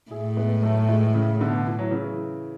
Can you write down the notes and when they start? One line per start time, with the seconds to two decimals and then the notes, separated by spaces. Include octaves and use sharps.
0.11 A2 E4 G#4
0.37 G#3 B3
0.63 F#3 A3
0.89 E3 G#3
1.14 C#3
1.40 B2 D3
1.67 E3
1.79 F#3
1.91 C#3 E3